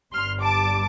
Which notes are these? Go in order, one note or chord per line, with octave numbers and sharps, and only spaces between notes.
G1 G2 G3 C6 F6
A5 D6